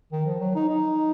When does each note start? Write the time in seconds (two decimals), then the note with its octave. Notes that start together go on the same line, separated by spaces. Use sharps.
0.12 D#3
0.26 F3
0.40 F#3
0.55 D#4
0.69 D#4